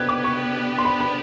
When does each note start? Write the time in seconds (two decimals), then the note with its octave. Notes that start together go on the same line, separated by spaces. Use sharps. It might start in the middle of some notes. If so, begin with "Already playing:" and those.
Already playing: B3 D4 G4 B4 F#6 G#6
0.09 D6
0.24 C#6
0.78 C6
0.85 B5
1.01 B5